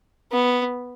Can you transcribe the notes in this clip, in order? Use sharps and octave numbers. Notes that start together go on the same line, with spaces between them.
B3